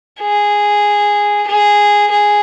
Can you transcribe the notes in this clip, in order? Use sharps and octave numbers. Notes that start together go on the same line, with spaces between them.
G#4
G#4
G#4